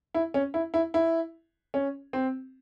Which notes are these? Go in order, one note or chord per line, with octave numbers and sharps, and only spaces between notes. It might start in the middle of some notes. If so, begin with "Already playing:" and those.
E4
C#4
E4
E4
E4
C#4
C4